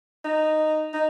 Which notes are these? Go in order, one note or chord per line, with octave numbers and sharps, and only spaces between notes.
D#4
D#4